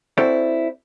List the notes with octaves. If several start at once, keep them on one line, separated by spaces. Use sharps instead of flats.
C4 E4 F#4 A4 C5 D5